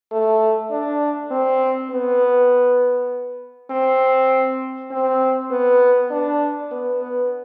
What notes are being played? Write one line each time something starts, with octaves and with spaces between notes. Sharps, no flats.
A3
D4
C4
B3
C4
C4
B3
D4
B3
B3